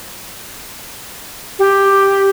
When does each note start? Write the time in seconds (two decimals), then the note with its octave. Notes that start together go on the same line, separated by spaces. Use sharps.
1.58 G4